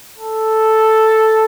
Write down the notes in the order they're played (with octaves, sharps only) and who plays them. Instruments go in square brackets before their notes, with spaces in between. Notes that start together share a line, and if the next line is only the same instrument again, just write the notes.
[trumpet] A4